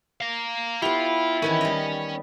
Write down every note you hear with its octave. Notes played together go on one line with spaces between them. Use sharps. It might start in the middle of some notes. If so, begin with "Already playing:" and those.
F5 A#5
B3 E4 F4 G4
D#3 E3 B3 C#4
G3 D#5